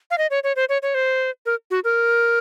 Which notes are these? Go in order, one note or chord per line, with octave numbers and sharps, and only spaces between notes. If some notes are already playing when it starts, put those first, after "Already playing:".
F5
D#5
C#5
C#5
C5
C#5
C#5
C5
A#4
F#4
A#4